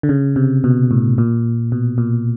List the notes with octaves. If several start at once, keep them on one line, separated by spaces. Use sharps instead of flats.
D3
C#3
C3
B2
A2
A#2
B2
A#2